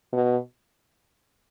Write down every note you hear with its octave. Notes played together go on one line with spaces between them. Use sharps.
B2